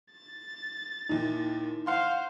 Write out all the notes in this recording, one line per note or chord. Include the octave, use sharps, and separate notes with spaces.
A6
D#2 A#2 D#4 E4
C5 F5 F#5 C6